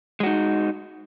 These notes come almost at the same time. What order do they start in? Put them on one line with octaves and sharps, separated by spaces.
G#3 F#4 D#4